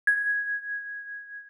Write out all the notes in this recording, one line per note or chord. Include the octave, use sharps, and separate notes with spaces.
G#6